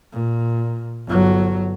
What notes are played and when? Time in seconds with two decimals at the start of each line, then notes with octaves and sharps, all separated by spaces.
0.12 A#2
1.07 G1 F#3